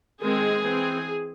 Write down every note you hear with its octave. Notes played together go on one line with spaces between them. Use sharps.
D#3 G#3 C4 G#4
E3 C4